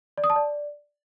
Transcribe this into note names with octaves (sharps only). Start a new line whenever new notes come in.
D5
D#6
A5
D5